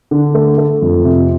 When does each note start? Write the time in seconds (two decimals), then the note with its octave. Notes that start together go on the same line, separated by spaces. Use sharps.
0.11 D3
0.34 A3
0.58 A3
0.82 F2
1.05 C3